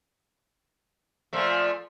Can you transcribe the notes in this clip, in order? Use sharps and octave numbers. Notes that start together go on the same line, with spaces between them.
A#2 F3 A3